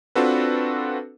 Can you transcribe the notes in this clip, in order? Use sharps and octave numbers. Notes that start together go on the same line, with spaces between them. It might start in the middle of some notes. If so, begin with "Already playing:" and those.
C4 D4 F4 F#4 A4 B4